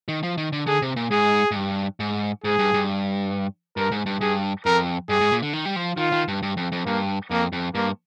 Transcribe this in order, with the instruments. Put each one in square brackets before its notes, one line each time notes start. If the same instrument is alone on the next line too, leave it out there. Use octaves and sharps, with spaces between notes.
[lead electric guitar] D#3
F3
D#3
D3
[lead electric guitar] D3 [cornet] G#4
[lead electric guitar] C3
A#2
[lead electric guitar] G#2 [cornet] G#4
[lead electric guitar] G#2
G2
G#2
[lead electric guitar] G#2 [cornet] G#4
[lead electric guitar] G2
G2
[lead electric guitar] G2 [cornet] A#4
[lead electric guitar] G#2
G2
[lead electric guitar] G2 [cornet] G#4
[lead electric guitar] F2 [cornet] A#4
[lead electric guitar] G2 [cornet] G#4
[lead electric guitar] G#2
A#2
D3
D#3
G3
F3
[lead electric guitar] D#3 [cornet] F4
[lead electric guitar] D#3
G2
G2
F2
F2
[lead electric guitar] G2 [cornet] A#3
[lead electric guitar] F2 [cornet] A#3
[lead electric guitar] F2
[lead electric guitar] G2 [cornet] A#3